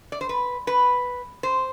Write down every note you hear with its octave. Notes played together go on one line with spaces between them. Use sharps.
D5
C5
B4
B4
C5